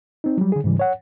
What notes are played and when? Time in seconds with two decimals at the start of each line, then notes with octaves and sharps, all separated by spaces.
0.24 C4 D#4
0.38 F#3 G3
0.52 D3 G#4
0.64 G#2 C#3 E3 G3
0.79 C#5 F#5